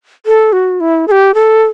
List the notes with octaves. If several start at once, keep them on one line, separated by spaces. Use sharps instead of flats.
A4
F#4
E4
A4
G4
A4